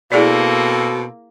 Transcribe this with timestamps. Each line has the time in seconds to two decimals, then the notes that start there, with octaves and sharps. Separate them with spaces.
0.12 B2 A#3 C4 E4 G#4 A4 D5